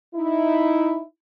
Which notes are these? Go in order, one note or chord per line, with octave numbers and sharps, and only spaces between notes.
D#4 E4